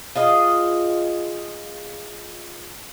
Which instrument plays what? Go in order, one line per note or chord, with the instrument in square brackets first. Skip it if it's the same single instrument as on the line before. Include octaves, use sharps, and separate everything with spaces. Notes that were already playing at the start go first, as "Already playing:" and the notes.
[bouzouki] F4 G#4 D#5